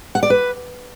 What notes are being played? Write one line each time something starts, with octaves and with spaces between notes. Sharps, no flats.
F#5
D5
B4